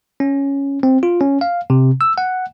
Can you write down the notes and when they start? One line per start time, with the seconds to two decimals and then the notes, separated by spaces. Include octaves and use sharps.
0.20 C#4
0.83 C4
1.03 F4
1.21 C#4
1.41 F5
1.70 C3
2.01 E6
2.18 F#5